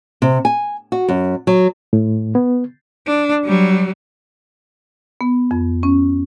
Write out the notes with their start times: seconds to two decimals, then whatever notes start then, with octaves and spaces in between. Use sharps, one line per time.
0.22 C3
0.45 G#5
0.92 F#4
1.08 F#2
1.47 F#3
1.93 A2
2.35 B3
3.07 D4
3.44 F#3 G3
5.21 B3
5.51 F2
5.83 C#4